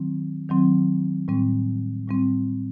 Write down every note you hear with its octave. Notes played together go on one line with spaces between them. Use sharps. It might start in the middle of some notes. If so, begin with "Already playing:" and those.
Already playing: D#3 F#3 C4
D#3 F#3 C4
A2 G3 C4
A2 G3 C4